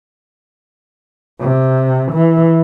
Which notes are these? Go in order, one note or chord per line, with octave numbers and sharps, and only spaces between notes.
C3
E3